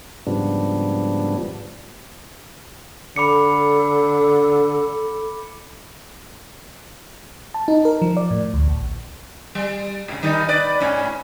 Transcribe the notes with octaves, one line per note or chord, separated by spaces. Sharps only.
G#2 C#3 F3 G3 B3 D4
D3 A4 B5 D6 C#7
A5
D#4
A#4
F3
D5
A2
D2
A#1
G3
G#2 C#3
D#3 G3 D#4
B4 D5
G#2 C#4